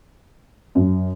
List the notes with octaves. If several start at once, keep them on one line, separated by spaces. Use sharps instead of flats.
F#2